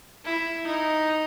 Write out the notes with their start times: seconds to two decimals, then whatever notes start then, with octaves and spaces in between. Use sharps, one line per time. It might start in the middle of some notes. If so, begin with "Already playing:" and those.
0.25 E4
0.66 D#4